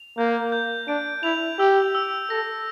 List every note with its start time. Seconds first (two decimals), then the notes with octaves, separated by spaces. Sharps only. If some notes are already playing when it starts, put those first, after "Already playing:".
Already playing: F7
0.18 A#3 G6
0.52 G6
0.88 D4 D7
1.23 E4 F7
1.59 G4 E6
1.95 E6
2.30 A4 A#6